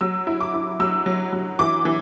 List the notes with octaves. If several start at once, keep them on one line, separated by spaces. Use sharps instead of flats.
F#3 E6
E4
D6
E4
F#3 E6
F#3
F#3
E3 D6
E3